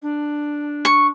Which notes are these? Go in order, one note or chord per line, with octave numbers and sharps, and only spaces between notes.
D4
C#6